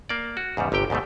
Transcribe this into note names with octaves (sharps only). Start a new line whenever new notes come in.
A#3 D5
F#4
E2 G#2 C#3 G3
G1 C3 G4 G5
D2 G#2 B2 G3 A3